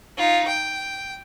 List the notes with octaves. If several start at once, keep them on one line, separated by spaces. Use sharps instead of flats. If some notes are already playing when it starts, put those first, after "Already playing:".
D#4 F4
G5